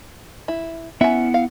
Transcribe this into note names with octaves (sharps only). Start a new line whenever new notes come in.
E4
B3 C#4 E4 E5 F#5
F5